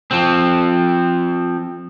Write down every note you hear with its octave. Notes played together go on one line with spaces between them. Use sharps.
F3 C4